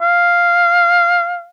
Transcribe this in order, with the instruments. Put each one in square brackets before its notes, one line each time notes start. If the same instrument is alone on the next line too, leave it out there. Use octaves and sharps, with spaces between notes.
[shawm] F5